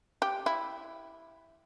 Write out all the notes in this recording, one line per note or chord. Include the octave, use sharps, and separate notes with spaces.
G4
E4